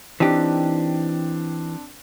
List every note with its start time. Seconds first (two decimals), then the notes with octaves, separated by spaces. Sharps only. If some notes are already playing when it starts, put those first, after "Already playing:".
0.20 E3 C4 D4 D#4 G4